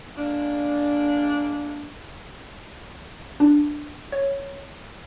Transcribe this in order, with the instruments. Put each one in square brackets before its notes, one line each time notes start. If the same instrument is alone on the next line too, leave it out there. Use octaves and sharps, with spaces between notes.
[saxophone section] G#3 A#3 D4
[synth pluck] D4
C#5